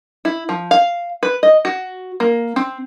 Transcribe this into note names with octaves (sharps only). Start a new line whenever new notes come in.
E4
F3
F5
B4
D#5
F#4
A#3
C4